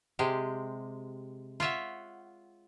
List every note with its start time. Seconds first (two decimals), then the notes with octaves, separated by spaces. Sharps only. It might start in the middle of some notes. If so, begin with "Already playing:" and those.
0.19 C3 G#3 G4
1.60 F4 C#5 E5 F#5